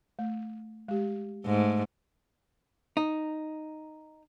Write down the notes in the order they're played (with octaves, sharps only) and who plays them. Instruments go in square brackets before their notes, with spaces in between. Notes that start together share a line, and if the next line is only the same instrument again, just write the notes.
[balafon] A3
G#3 G4
[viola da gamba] G#2 A3
[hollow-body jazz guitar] D#4